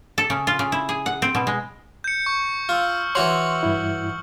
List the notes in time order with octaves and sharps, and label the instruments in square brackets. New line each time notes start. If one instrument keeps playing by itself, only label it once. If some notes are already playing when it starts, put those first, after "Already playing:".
[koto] A4
C#3
F4
C#3
E4
G#4
F#5
C4
B2
G#3
[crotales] G6 C#7
C#6
[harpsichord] F4 [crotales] E6 F6
[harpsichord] E3 F#4 C#5 [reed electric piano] C6 [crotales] F#7
[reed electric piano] G2 E4